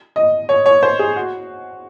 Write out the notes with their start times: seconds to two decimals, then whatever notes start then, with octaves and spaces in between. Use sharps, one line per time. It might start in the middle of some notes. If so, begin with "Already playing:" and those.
0.16 D#5
0.49 C#5
0.66 C#5
0.83 C5
0.99 G#4
1.16 F#4